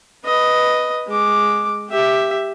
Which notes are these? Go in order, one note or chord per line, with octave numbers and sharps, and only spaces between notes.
B4 D#5
G#3 D6
G4 E5